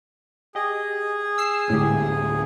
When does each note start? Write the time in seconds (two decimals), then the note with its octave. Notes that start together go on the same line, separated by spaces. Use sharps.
0.55 G4 G#4 D#5
1.38 E6 C7
1.70 D1 A2 D3 G#3 G4